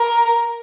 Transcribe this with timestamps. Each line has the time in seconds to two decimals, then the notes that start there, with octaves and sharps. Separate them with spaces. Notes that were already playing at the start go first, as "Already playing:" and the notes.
Already playing: A#4